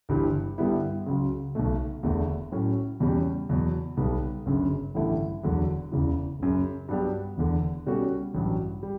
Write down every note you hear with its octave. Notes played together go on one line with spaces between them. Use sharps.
G1 G2 E3 G3
G2 D3 G3 B3 E4
C#2 C#3 F#3
B1 B2 A3
E1 E2 D3 A3
A2 F#3 C#4
E2 B2 G3 C#4
E2 B2 F#3
B1 B2 G3 B3
G1 F#2 C#3
A1 G2 D3 A3 E4
E1 E2 D3 F#3
E1 E2 C#3 E3
F#1 F#2 C#3
G2 F#3 B3 D4 G4
E1 E2 D3
B2 G3 C#4 F#4 A4
A1 G2 F#3
G3